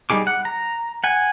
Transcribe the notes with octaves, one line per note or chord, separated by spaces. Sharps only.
G3 C#4 D#4 G#4 D6
F#5
A#5
F#5 G#5